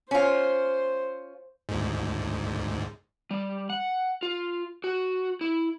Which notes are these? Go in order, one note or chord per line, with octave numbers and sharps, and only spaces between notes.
C#4 F4 C5
D2 G#2
G3
F#5
F4
F#4
E4